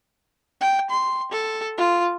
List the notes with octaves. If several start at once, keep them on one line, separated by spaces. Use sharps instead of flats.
G5
C6
A4
F4